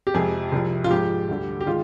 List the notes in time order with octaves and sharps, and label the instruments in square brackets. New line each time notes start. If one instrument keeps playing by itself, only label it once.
[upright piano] G4
F2 C3 F3 G#3 G#4
C2 C3 F3
F4
G#2 F3 G#3 G4
D2 D3 G3
G4
D#3 G#3 F4